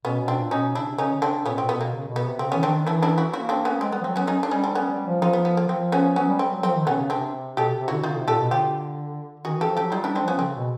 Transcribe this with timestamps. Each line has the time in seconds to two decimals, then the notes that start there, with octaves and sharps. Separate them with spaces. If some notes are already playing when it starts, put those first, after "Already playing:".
0.05 B2 B3 C#4
0.20 B2
0.28 C4 D4
0.36 A#2
0.51 B2 C#4 D#4
0.75 C#3 D4 E4
0.88 C3
0.98 C#3 C#4 D#4
1.10 D3
1.22 C#3 C4 D4
1.45 A#2 B3 C#4
1.54 B2
1.58 A#2 C4
1.69 B2 B3
1.81 A#3
1.93 C#3
2.08 B2
2.16 B3
2.24 C3
2.39 C#3 C4
2.52 E3 B3 C#4
2.63 D#3 C4 D4
2.87 E3 D4 E4
3.02 D4 E4
3.18 E4 F#4
3.33 A#3 E4 F#4
3.49 C4 D4
3.65 B3 C#4
3.81 G#3 C4
3.92 G3 B3
4.01 F3
4.04 F#3 C4
4.16 F#3 B3 C#4
4.27 C#4 D#4
4.43 D4
4.51 G3 C#4 D#4
4.64 C4 D4
4.75 G3 B3 C#4
4.91 G3
5.07 F3
5.22 F3 D#4 F4
5.33 B3
5.45 B3
5.57 A#3
5.68 F3 C4
5.92 B3 C#4
6.16 F#3 B3 C#4
6.28 G3
6.39 G3 C4
6.51 F#3
6.63 F3 C4
6.75 D#3
6.87 C3 B3 C#4
6.99 C#3
7.10 C3 C4 D4
7.57 B2 G4 A4
7.80 C3
7.88 D3 E4 F#4
8.03 D3 D#4 F4
8.16 C3
8.28 A#2 G4 A4
8.40 B2
8.51 D3 F4 G4
9.45 D#3 F#4 G#4
9.57 E3 G4 A4
9.69 F3
9.77 F#3 G4 A4
9.92 G3 D#4 F4
10.04 G3 D4 E4
10.15 C4 D4
10.23 F3 B3 C#4
10.39 C#3 C4
10.55 B2